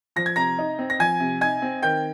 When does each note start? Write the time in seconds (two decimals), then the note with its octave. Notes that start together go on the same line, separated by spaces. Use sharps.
0.16 F3 A#6
0.26 G#6
0.36 C3 A#5 A#6
0.59 D#4
0.79 C4
0.90 A#6
0.99 F3 G#5 G#6
1.20 C3
1.41 D#4 G#5 G#6
1.62 C4
1.82 D#3 G5 G6